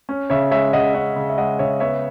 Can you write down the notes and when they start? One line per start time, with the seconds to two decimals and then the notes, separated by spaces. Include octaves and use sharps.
0.09 C#4
0.30 C#3 C#5 E5
0.51 G#3 C#5 E5
0.73 C#3 D#5 F#5
0.94 C#4 D#5 F#5
1.16 C#3
1.30 E5
1.38 G#3 D#5 F#5
1.59 C#3 C#5 E5
1.80 B3 C#5 E5